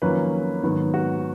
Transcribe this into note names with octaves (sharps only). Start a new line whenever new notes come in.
F2 D#3 F#3 A#3 C#4 B4
G#2 D#3 F#3 B3
F#4